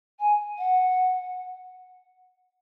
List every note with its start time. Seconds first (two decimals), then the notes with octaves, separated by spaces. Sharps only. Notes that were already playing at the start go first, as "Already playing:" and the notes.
0.19 G#5
0.58 F#5